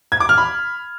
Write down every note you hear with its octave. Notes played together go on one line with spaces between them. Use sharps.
G#6
D6
F6
B5